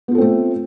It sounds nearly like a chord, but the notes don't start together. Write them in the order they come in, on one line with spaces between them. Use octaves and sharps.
B3 F4 A4 C4 A3